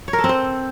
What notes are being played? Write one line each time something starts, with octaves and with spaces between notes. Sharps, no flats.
C#5
A#4
A4
C4
C5